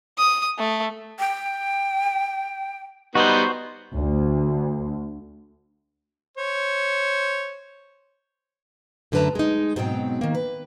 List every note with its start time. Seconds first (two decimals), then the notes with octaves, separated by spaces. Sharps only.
0.18 D#6
0.58 A3
1.19 G5
3.15 G3 B3 D#4 F#4 C5
3.94 D2
6.37 C5 C#5
9.12 F#2 D3 A3 B4 A5 A#5
9.35 G#3 D#4
9.76 G#2 B2 F#3 C4 G5
10.21 D#3 A#3
10.35 B4